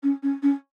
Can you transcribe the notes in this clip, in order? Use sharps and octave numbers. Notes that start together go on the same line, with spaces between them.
C#4
C#4
C#4